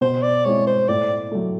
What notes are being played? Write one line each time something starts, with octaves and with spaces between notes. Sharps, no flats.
B2 C5
D5
G#3 C4 E4 C#5
C5
A2 D5
F#3 A3